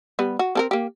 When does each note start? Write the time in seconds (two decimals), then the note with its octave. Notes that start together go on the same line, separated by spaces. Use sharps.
0.19 G3 B3
0.39 F#4
0.55 C4 A4 A#4
0.71 A#3 G4